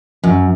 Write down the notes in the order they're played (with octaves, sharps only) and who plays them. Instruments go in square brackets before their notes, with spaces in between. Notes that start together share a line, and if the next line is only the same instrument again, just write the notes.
[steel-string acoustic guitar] F#2